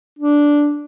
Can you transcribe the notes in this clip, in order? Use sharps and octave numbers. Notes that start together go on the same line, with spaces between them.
D4